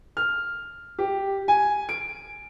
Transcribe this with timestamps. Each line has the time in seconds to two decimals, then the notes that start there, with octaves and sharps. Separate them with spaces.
0.17 F6
0.99 G4
1.48 G#5
1.89 D7